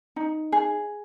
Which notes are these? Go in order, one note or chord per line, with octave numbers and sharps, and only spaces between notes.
D#4
G#4